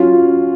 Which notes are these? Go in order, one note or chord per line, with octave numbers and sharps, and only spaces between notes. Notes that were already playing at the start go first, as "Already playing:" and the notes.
Already playing: F#3 C#4 F4